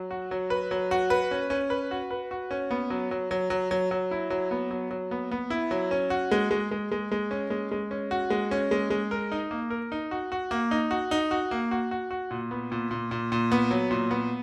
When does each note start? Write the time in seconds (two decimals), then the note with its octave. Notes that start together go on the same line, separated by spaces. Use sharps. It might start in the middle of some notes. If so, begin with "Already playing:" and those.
Already playing: F#3
0.11 F#4
0.31 F#3
0.50 B4
0.71 F#3
0.91 F#4
1.10 B4
1.31 C#4
1.50 C#4
1.70 B4
1.91 F#4
2.11 B4
2.31 F#4
2.51 C#4
2.71 B3
2.90 F#3
3.11 F#3
3.31 F#3
3.50 F#3
3.71 F#3
3.91 F#3
4.11 E4
4.30 F#3
4.51 B3
4.71 F#3
4.91 F#3
5.11 B3
5.31 B3
5.50 E4
5.71 F#3
5.91 C#4
6.10 F#4
6.31 G#3
6.51 G#3
6.71 G#3
6.92 G#3
7.12 G#3
7.31 C#4
7.50 G#3
7.72 G#3
7.91 C#4
8.11 F#4
8.30 G#3
8.51 C#4
8.71 G#3
8.90 G#3
9.11 A#4
9.32 D#4
9.51 A#3
9.70 A#4
9.92 D#4
10.11 F#4
10.32 F#4
10.51 A#3
10.71 D#4
10.91 F#4
11.11 D#4
11.31 F#4
11.51 A#3
11.71 F#4
11.91 F#4
12.11 F#4
12.31 A#2
12.51 B3
12.72 A#2
12.91 A#2
13.11 A#2
13.32 A#2
13.52 B3
13.71 F#3
13.91 A#2
14.11 B3